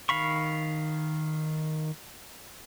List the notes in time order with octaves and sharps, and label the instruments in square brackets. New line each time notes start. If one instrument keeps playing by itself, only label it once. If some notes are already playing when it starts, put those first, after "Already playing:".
[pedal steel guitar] D#3 F5 B5 C#6